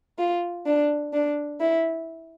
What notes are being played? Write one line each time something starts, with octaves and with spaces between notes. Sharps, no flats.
F4
D4
D4
E4